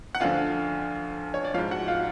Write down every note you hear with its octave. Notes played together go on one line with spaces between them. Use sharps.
F#5
D2 D3 F3 F4 F5
C#5
D5
G#2 F3 F4 F5
F#4 F#5
F4 F5